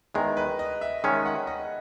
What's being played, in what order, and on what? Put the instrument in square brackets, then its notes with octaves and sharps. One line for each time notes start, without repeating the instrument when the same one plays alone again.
[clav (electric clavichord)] E2 D#3 G#3 [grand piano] A#4
[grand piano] B4
D#5
E5
[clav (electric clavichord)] D#3 G#3 C#4 [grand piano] E5
[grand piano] F#5
D#5